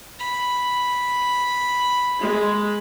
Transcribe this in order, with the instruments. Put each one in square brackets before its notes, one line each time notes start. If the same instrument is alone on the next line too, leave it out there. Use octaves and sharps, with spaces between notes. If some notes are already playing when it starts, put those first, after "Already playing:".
[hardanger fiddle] B5
[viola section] G#3